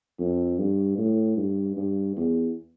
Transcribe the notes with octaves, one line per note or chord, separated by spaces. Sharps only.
F2
G2
A2
G2
G2
E2